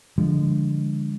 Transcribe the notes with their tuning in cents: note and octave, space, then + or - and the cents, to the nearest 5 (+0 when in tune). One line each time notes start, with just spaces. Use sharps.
D3 +0 F3 -15 G#3 -20